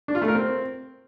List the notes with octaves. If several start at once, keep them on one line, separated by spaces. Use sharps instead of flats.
D4
F4
A3
A#4
C4